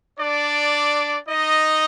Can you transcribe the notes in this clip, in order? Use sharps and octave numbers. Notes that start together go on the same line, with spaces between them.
D4 D5
D#4 D#5